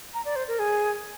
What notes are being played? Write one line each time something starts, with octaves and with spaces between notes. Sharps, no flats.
A#5
D5
C5
A#4
G#4